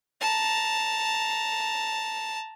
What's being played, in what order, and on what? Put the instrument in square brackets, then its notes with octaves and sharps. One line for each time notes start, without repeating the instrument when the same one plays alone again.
[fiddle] A5 A#5